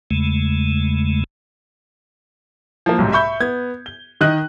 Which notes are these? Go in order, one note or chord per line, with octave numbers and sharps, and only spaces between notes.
E2 C#3 G#3 A3
F3 A#3
B1 G#2 C3
E5 B5 C#6 G6
B3 G#6
G7
D#3 D#5 F#6